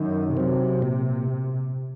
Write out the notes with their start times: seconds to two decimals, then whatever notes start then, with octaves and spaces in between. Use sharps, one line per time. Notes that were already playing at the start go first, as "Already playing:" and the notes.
Already playing: F#2 D#3
0.37 C3 F#3 C4
0.82 A#2